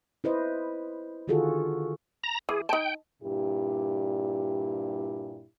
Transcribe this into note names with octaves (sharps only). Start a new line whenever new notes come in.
E4 B4 C5 D#5
D3 D#3 F4 F#4 G#4 A4
A#5
E3 G#4
D#4 G5 A5
G2 A#2 E4 G4